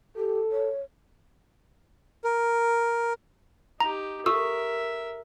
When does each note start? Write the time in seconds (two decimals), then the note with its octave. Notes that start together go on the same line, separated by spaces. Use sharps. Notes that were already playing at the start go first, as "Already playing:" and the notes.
0.16 G4 A4
0.52 C#5
2.24 A#4
3.80 D#4 G4 A#5
4.26 G4 A4 A#4 E5 E6